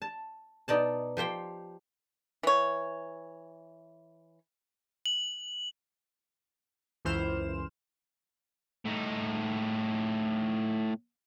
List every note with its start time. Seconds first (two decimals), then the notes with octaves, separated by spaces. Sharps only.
0.02 A5
0.68 B2 D#4 D5 A5
1.17 F3 G4 C5 G5
2.43 E3 C#5
5.06 F#7
7.05 C#2 F#2 E3 C5 F6 E7
8.85 A2 D#4